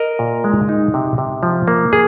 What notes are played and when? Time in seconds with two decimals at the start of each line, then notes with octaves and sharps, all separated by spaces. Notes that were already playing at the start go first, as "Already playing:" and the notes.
Already playing: A#4 D#5
0.19 A#2
0.44 G#3
0.69 D#4
0.94 C3
1.18 C3
1.43 F3
1.68 A#3
1.93 G#4